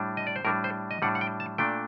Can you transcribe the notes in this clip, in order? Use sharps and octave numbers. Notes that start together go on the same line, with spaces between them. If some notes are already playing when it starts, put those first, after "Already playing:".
Already playing: A2 G3 D4
D#5
D5
C5
A2 G3 D4 A#4
C5
D#5
A2 G3 D4 F#5
F#5
G5
A5
A#2 A3 D4 G5